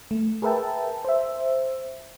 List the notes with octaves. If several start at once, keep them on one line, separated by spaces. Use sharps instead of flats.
A3
G#4 A#4 B4 E5 G5 A5
C5 E5